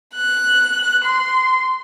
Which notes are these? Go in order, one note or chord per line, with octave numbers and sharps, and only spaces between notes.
F#6
C6